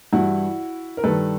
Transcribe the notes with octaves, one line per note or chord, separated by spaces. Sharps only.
G2 E3 E4 F#4
A#4
G2 D#3 A4 B4